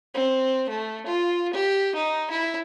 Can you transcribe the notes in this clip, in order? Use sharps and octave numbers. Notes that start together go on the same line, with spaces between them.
C4
A3
F4
G4
D#4
E4